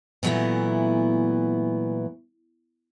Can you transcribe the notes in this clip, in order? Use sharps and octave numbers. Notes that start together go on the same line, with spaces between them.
A#2 E3 F#3 A3 B3 E4